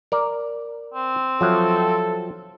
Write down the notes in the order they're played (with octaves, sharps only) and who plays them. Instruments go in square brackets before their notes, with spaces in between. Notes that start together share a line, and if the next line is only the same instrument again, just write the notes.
[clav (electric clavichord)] A#4 D5
[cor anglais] C4
[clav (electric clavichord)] F3 F#3 E5 [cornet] A4